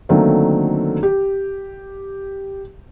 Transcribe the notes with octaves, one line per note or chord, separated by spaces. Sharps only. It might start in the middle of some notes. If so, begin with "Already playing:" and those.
D3 D#3 F#3 A3 A#3 C4
G4